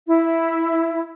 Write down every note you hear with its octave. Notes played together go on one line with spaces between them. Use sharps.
E4